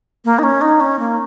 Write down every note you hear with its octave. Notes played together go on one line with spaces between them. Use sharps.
A#3
D#4
C#4
D#4
C#4
A#3